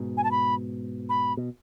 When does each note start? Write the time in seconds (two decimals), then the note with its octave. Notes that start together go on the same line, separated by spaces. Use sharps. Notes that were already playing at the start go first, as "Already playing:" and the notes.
Already playing: G#2 B2
0.17 G#5
0.24 A5
0.31 B5
1.09 B5
1.37 B2